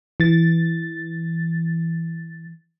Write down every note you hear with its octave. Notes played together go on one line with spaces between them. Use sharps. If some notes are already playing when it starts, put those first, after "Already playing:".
E3 A6